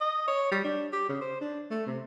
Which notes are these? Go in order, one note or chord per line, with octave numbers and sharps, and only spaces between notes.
D#5
C#5
G3
D4
G4
C#3
C5
D4
A3
C3